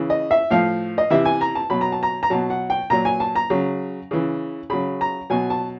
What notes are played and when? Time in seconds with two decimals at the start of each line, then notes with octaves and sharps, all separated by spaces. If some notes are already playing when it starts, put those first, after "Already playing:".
Already playing: C#3 E3
0.10 D#5
0.31 E5
0.50 A2 F3 F5
0.98 D#5
1.10 C3 E3 E5
1.25 G#5
1.41 A#5
1.55 A5
1.70 B2 F#3 B5
1.81 A#5
1.92 A5
2.03 A#5
2.23 A#5
2.30 B2 F#3 A5
2.50 F#5
2.70 G5
2.90 A#2 F#3 A#5
3.05 G#5
3.20 A5
3.35 A#5
3.50 C#3 F#3
4.11 C#3 E3
4.70 C#3 F#3 B5
5.01 A#5
5.30 B2 F#3 G#5
5.50 A5